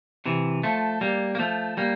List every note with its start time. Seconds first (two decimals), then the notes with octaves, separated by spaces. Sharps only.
0.26 C3 E3
0.63 F3 A3
1.01 G3 A#3
1.35 A#3
1.39 F3 A3
1.77 G3 A#3